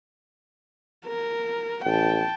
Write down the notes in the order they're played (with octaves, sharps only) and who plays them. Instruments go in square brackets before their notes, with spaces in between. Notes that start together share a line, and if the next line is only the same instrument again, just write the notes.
[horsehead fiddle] A#4
[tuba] A1 [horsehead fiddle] G5 A5